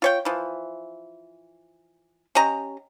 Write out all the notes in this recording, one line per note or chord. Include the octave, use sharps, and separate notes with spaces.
F4 C#5 G5
E3 F3
C#4 G4 D#5 A#5